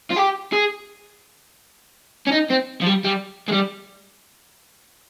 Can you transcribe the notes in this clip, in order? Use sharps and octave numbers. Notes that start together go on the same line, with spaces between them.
F4
G4
G#4
C#4
D#4
C4
F3
G3
G3
G#3
G3